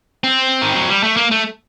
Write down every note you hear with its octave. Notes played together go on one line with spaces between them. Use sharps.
C4
D#3
F#3
G3
A3
A#3
A3